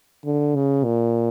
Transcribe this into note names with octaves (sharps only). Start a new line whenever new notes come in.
D3
C#3
A#2